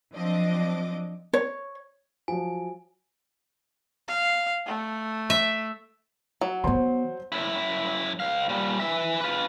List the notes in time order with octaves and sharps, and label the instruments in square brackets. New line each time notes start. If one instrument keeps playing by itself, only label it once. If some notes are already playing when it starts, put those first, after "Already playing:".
[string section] F3 F#3 C4 D4 D#5 D6
[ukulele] C#5
[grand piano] F3 F#3 [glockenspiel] G#5
[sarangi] F5
A3
[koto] E5
[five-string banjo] F#3
[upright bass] D#3 B3 [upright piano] C5 C6
[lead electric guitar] F#2 E4
C#2 F5
A#2 G3
E3 E5
F4 B4